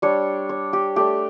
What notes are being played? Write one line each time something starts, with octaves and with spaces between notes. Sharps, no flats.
G3 D4 C#5
C#5
G4
A3 D4 G4